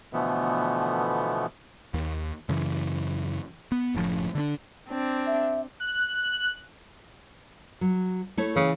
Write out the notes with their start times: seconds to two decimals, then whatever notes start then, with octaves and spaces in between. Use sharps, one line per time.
0.13 B2 D3 E3 F3 A3 B3
1.94 D#2
2.49 F#2 C#3 E3
3.72 B3
3.94 F#1 A2 C#3 F3
4.35 D3 A#3 D4
4.88 C4 D4
5.26 E5
5.80 F#6
7.81 F#3
8.37 A3 E4 C#5
8.56 C#3 E3